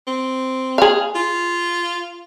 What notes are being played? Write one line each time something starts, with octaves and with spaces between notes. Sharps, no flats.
C4
G#4 F5
F4